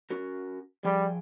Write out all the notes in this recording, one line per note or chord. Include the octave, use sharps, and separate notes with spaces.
C#4 F#4 A#4
F3 G3 G#4 G5